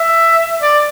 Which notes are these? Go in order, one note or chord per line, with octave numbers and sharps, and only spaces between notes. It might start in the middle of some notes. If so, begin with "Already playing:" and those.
Already playing: E5
D5